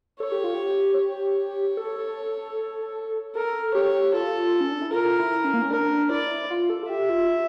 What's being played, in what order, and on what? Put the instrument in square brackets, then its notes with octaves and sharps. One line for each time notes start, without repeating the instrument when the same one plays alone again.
[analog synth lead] A4 [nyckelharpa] C#5
[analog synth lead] G4
F4
G4
[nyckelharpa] C#5
[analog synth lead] A4
[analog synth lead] A4 [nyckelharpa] A#4
[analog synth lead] G4 [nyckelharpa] C#5
[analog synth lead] F4 [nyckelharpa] A4
[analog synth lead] C#4
D4
E4
[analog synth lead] F4 [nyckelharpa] A#4
[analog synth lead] E4
C#4
A#3
C#4
[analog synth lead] D4 [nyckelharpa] A#4
[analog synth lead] E4 [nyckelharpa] D5
[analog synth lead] F4
A4
F4
[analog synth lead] G4 [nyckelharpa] E5
[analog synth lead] F4